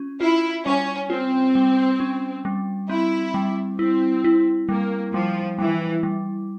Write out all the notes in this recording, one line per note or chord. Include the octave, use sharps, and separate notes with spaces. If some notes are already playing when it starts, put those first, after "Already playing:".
Already playing: C#4 F4
E4 F4
G3 C#4
C4 F4
G3
C#4
G3
C4 E4
G3
C4 E4
E4
G3 A#3
F3 G3
E3 G3
G3